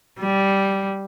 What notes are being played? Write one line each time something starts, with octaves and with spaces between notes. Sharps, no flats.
G3